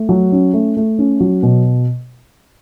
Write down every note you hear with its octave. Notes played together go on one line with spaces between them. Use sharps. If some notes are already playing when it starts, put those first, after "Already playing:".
Already playing: A3
F#3
C#4
A3
A3
C#4
F#3
B2